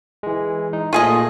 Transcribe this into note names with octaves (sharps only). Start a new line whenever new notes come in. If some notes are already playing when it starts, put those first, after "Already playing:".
E3 G#3
D#4
A#2 A3 F4 G#4 D#5